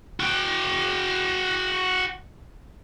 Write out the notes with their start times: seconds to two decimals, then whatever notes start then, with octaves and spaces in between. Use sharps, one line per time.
0.20 F#4 G5